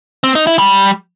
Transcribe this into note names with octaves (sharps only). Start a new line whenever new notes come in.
C4
D#4
E4
G3